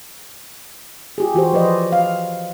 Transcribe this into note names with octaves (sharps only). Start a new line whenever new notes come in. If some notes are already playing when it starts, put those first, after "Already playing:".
F4 G4 G#4
E3 F#4 G4 C5
F3 B4 C5 D5 D#5
F5